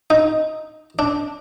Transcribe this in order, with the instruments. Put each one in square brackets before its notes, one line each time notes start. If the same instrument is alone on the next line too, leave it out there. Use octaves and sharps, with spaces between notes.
[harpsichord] D#4
D4